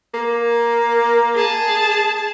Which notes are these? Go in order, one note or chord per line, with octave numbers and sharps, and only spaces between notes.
A#3
G#4 A5